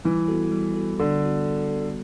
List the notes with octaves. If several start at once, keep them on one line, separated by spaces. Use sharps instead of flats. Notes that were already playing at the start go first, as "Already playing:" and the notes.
E3 G3
B3 F#4 A4
G3
B3 F#4 A4
D3 G3
B3 F#4 A4
G3
B3 F#4 A4